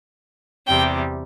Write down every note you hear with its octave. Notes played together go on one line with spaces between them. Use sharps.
E2 C3 G3 G5